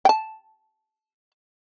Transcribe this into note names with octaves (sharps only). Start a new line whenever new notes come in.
G5 A5